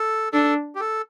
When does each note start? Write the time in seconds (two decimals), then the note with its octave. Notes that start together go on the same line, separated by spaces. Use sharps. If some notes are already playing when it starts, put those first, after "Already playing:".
Already playing: A4
0.33 D4 A4
0.75 G4
0.80 A4